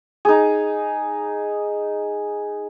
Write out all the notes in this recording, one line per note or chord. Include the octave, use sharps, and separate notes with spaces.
D#4 G#4